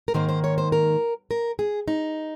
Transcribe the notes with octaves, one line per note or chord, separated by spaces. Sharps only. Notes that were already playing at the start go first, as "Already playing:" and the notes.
A#4
G#2 D#3 A#3 C5
C5
C#5
C5
A#4
A#4
G#4
D#4